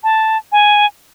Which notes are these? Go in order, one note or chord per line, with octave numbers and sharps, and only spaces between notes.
A5
G#5